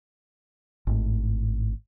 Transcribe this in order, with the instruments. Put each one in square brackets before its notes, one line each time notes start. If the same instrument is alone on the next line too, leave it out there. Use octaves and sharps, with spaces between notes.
[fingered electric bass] G#1 A2